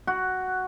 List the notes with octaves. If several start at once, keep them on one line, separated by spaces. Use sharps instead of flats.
F#4